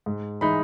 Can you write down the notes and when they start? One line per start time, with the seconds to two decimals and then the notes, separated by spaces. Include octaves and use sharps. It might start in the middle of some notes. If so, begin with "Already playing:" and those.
0.06 G#2
0.41 E3 G#3 D#4 B5